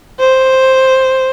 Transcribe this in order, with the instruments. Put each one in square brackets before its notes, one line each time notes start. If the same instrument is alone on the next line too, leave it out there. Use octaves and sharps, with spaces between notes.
[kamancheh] C5